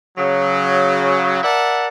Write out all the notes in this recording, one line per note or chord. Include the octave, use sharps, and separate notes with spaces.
C#3 F#3
A#4 D5 E5 F#5 A5